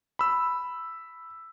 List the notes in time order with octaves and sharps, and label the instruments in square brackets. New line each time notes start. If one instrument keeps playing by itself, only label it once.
[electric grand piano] B5 E6